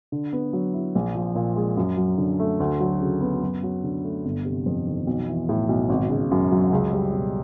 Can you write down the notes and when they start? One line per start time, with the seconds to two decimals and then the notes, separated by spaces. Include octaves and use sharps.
0.12 D3
0.33 B3
0.53 F#3
0.73 E4
0.95 A#1
1.15 F3
1.35 A#2
1.56 G#3
1.77 F#2
1.97 F#3
2.18 D3
2.39 A3
2.60 D2
2.80 F#3
3.01 C#3
3.21 B3
3.42 F#2
3.63 F#3
3.84 D3
4.04 A3
4.25 G1
4.45 C3
4.66 F2
4.87 D#3
5.07 B1
5.28 E3
5.49 A2
5.69 B1
5.89 G#1
6.10 C#3
6.31 F#2
6.51 F#3
6.73 C#2
6.93 G3
7.13 B2